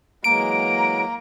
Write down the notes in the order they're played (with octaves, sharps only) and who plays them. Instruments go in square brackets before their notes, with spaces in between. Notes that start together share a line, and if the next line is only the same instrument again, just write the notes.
[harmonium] E3 F#3 G#3 [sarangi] A#3 [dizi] A#5 [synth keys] D7